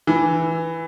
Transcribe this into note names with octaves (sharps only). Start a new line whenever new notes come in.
E3